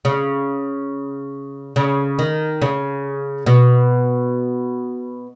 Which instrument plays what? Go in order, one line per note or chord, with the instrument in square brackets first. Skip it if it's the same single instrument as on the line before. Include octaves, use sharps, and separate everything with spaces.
[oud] C#3
C#3
D#3
C#3
B2